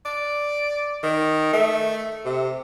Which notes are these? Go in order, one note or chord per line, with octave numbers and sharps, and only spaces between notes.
D5
D#3
A3
C3